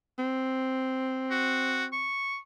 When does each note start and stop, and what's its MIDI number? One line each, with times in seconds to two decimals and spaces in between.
0.19 2.10 60
1.30 1.84 66
1.92 2.38 85